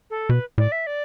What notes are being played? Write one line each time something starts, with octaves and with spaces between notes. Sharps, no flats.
A4
B2 B4
A2 D5
E5
D5